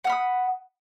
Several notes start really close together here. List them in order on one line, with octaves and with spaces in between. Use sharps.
F#5 F6 B5 D#6